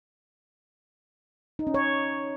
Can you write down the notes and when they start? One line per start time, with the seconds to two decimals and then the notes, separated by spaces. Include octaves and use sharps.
1.59 D#4
1.67 C#4
1.74 C#5